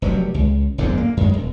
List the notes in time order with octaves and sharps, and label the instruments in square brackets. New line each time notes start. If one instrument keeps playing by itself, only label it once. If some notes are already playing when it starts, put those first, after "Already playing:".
[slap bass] F1 F#3 G3
C#2
F#1 E2 G#2 D3
A#3
F#2 G#3
E1